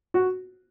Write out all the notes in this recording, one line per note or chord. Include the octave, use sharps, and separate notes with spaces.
F#4